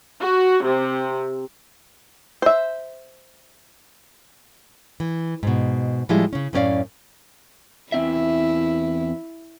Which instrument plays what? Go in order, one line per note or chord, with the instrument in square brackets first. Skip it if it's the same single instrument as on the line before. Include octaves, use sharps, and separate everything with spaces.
[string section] F#4
C3
[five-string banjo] C5 E5
[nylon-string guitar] E3
G#2 B2
A2 F3 G3 G#3 E4
C#3 C#4
F#2 A2 B3 C#4 D5 F5
[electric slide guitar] E2 C4 E5 [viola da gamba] E4